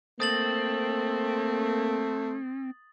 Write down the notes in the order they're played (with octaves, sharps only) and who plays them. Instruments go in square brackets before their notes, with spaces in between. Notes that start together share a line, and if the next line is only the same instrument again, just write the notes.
[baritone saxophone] A3 [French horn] A#3 [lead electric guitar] C4 [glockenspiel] D#6 A6 F#7